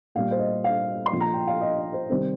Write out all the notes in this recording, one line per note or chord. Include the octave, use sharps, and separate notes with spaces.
A#2 G3 F5
C5
D#5
F5
C6
A#2 F3
A#5
G5
F5
D#5
C5
C3 D#3 G3 C5